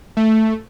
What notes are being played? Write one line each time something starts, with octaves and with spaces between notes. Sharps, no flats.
A3